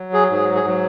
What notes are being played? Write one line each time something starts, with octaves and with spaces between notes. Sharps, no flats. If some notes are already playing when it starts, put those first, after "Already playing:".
Already playing: F#3
G#4
G#2 G#4
G#4
F#3